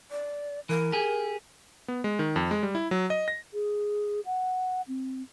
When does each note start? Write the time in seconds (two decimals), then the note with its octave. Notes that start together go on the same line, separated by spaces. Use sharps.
0.11 D5
0.69 E3 A#4
0.92 G4 G#4
1.88 B3
2.04 G#3
2.19 D#3
2.36 F2
2.51 G#3
2.63 G3
2.75 E4
2.91 F#3
3.10 D#5
3.28 A#6
3.54 G#4
4.26 F#5
4.88 C4